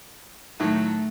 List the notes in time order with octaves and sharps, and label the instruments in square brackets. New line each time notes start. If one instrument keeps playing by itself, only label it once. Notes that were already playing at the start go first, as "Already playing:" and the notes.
[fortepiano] A2 D#3 F#3 [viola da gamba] A3